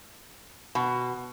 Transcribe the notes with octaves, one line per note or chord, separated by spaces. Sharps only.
B2